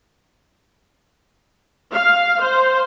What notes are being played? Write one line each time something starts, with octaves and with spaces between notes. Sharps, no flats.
F5
C5